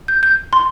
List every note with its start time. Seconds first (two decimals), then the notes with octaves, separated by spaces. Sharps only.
0.08 G6
0.23 G6
0.53 C6